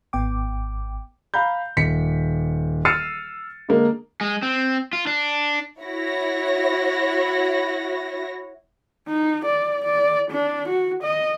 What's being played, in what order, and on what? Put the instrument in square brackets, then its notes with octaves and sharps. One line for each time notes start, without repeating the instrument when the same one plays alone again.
[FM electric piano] G#1 B3 G5 D6
[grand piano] F5 A#5 B5 G6
D#1 B6 C#7
E6 F6 A6 C7 C#7 D#7
D3 G#3 A#3
[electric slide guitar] G#3
C4
F4
D4
[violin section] E4 F#4 C#5 A#6
[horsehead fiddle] D#4
D5
D5
D4
F#4
D#5